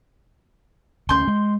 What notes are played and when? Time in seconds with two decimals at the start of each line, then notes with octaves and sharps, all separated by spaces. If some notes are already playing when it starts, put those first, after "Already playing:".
1.09 D2 C#4 C6 G6
1.28 G#3